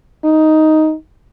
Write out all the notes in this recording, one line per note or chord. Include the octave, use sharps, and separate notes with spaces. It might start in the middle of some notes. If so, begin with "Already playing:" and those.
D#4